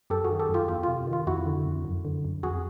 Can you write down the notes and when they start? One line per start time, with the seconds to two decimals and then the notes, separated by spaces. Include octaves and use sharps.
0.10 F#2 G4 A4
0.24 D#3 F#4 G#4
0.39 G4 A4
0.49 F#2
0.54 F4 G4
0.68 E2 F4 G4
0.83 C3 F4
1.07 D#3
1.13 F4
1.27 F2 E4 F#4
1.46 D3
1.66 F2
1.85 F#2
2.05 D3
2.25 F#2
2.43 F2 F#4 G#4